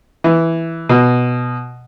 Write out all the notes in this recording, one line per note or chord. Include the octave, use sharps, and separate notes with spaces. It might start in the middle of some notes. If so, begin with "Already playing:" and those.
E3
B2